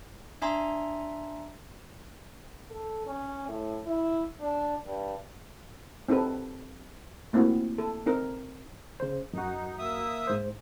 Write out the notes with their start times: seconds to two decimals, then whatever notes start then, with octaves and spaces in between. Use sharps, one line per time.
0.42 D4 E5 G#5 A#5 C6
2.71 A4
3.07 C#4
3.48 A2
3.86 E4
4.40 D4
4.86 G2
6.08 C4 D#4 G4 A4 B4
7.33 A3 A#3 C4 E4 F#4
7.78 A4
8.06 C4 D#4 A#4
9.00 C#3 C5
9.33 F#2 D#4 F#4
9.78 A#3 E5 D#6
10.27 G#2 C5